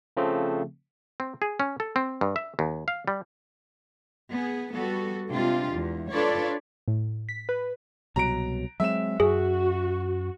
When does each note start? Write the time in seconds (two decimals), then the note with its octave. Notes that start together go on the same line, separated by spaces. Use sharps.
0.17 C#3 F3 A3 C4
1.20 C4
1.42 G#4
1.60 C#4
1.80 A4
1.96 C4
2.21 G2
2.36 E5
2.59 D#2
2.88 F5
3.08 G3
4.31 B3 G#4
4.73 G3 B3 F#4 A4
5.30 C3 G#3 D4 F4 G4
5.74 E2
6.11 D4 F4 A4 B4 C#5 D5
6.88 A2
7.29 B6
7.49 B4
8.16 C2 B2 F#3 A#5 D7
8.80 F#3 G#3 C4 E5 E7
9.20 F#2 F#4 G#4